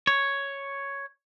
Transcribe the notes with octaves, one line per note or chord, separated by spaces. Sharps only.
C#5